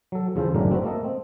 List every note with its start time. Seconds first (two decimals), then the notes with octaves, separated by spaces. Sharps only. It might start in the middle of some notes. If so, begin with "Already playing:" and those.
0.12 F#3 A4
0.36 E2 C#3 F4 A4 C5
0.54 G#1 F#2 A2 C#3 D4 A#4
0.71 C4 D4 F#4 B4
0.84 A3 A#3 A4 D#5
1.04 C4